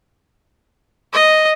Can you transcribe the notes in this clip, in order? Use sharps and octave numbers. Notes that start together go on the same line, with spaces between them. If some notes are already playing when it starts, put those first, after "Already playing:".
D#5